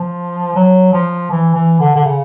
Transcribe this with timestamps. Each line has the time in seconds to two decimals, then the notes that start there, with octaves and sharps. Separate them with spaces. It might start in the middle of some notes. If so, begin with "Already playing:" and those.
Already playing: F3
0.56 F#3
0.93 F3
1.31 E3
1.54 E3
1.80 D3
1.95 D3
2.05 C#3